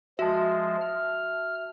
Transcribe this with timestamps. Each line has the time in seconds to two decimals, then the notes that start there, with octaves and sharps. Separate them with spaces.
0.19 F3 G#3 F#4 E5 A5
0.81 F6